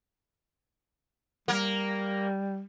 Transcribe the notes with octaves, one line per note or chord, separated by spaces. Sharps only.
G3 A#3 A#4